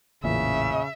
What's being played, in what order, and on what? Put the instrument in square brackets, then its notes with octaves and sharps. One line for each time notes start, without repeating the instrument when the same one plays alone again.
[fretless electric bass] A1 E3 [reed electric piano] E2 A#2 [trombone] C#3 [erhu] E5